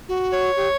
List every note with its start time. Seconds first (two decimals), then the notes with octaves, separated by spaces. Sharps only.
0.09 F#4
0.32 C#5
0.56 G4